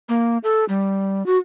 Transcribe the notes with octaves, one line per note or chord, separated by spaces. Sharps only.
A#3
A4
G3
F#4